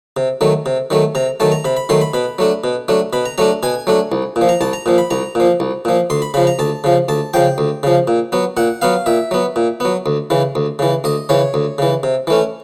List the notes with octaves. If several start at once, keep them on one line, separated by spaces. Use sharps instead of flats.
C3
D#3 F#3 A3
C3
D#3 F#3 A3
C3 A#5
D#3 F#3 A3 A5
A#5
C3 B5
B5
D#3 F#3 A3 C6
B5
B2 B5
F#3 A3 D4
B2
F#3 A3 D4
B2 B5
A#5
F#3 A3 D4 A#5
B2 G#5
F#3 A3 D4
C2
A#2
F3
A#5
C2 A5
A#5
A#2 F3
B5
C2 A#5
A#2 F3
C2
A#2 F3
D2 C6
B5
C#3 F3 B5
A#5
D2 A5
C#3 F3
D2 A5
C#3 F3 G5
D2
C#3 F3
A#2
F#3 B3
A#2 F#5
F#3 B3 F5
A#2 E5
F#3 B3
A#2
F#3 B3
D2
C#3 E3
D2
C#3 E3
D2 D#5
C#3 E3 C#5
D2
C#3 E3
C3
E3 A3 C#4